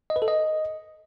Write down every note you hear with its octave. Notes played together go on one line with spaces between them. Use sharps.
D#5
B4
A4
D#5